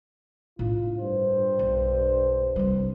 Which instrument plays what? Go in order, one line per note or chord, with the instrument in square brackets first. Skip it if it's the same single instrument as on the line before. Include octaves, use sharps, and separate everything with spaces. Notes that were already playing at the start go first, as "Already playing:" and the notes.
[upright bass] A2 D4 [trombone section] F4
[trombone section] G2 C5
[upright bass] B1
C2 G3